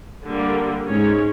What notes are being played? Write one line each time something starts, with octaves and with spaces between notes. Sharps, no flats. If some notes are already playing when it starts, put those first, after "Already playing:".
D3 G3 A#3
G#2 G#3 C#4 C#5